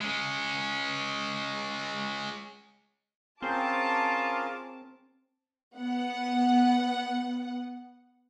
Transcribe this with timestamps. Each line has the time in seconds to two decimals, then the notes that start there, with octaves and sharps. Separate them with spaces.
0.01 G#3 C#4
3.42 C4 C#4 F4 G#4 A#4 A5 D6
5.75 B3 F#5